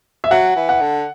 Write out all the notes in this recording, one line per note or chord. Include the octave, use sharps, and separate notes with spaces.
E5
F#3 F#5
E3
F#5
D3